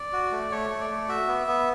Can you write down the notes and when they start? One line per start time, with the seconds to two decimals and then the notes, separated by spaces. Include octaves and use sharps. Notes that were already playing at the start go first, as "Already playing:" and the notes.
Already playing: D5
0.12 F#4
0.32 A3
0.51 A3 C#5
0.70 A3
0.80 D5
0.90 A3
1.08 F#4 E5
1.28 B3
1.47 B3